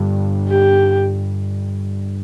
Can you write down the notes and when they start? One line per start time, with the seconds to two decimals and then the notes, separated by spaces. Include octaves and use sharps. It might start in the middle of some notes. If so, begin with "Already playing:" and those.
Already playing: G2 D3 G3
0.49 G4